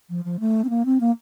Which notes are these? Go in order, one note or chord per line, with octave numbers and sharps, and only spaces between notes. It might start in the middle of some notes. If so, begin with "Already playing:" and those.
F3
F3
A3
C4
A#3
C4
A#3